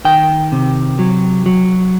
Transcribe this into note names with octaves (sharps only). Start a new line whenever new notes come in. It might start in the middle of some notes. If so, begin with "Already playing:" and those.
D#3 G5
C3
F#3
F#3